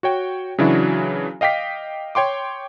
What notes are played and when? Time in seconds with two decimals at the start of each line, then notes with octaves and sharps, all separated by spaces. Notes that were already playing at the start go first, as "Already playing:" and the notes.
0.03 F#4 C#5 G5
0.58 C#3 E3 F#3 D4 E4 F#4
1.41 D#5 F5 G5 D6 B6
2.15 C#5 G5 C6 D6